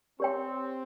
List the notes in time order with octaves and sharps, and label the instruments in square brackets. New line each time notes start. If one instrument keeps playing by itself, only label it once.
[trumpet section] C4 [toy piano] G4 C#5 G5